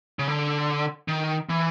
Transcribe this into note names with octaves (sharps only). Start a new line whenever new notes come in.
C#3
D3
D#3
E3